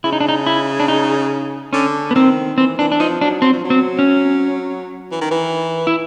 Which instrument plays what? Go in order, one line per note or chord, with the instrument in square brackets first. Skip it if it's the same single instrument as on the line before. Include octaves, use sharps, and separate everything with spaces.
[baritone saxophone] C#3 [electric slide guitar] E4
[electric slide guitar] D#4
D4
D#4
E4
D4
D#4
[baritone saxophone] D3 [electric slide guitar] C#4
[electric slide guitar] B3
[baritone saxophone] D#3 [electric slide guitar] C4
[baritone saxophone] E3 [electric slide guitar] C4
[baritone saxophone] E3 [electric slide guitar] D4
[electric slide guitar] D4
[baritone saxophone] F3 [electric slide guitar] D#4
[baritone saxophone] F#3 [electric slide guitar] D4
[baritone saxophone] F#3 [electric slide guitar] C4
[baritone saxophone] F3
F#3
[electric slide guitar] C4
C#4
[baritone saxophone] E3
D#3
E3
[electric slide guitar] E4